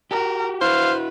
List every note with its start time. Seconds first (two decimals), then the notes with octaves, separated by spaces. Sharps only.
0.11 F#4 G4 A#4
0.62 E4 F#4 B4 C5 F5